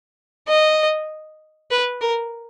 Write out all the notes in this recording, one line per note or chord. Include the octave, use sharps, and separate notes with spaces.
D#5
B4
A#4